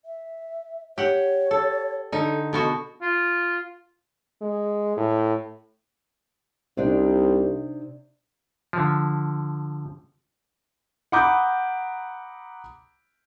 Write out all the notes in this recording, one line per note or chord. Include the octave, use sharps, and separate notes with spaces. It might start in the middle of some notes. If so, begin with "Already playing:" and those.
E5
G4 C#5 F#5
A4
D3 D#4 A4
B2 B3 F#4 A4
F4
G#3
A2
C2 C3 D4 D#4
D3 F3
F#5 A#5 B5 D6 D#6 G6